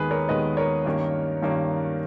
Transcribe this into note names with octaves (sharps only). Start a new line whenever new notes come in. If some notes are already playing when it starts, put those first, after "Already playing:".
Already playing: D#2 D#3 G#3 B3 G#4 B4
A#4 C#5
D#2 D#3 G#3 B3 B4 D#5
A#4 C#5
G2 D#3 A#3 C#4
G2 D#3 A#3 C#4